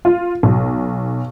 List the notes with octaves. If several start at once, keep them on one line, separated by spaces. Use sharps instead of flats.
F4
B1